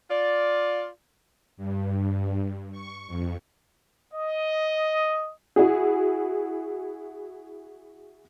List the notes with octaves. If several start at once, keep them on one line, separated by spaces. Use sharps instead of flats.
F4 D5
G2
C#6
F2
D#5
E4 F#4 G#4